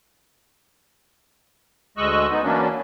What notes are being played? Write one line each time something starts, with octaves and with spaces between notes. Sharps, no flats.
D2 G#3 D#5 C#6 E6 F#6
B3 D#4
E3 F#3 A#3 C#4 D4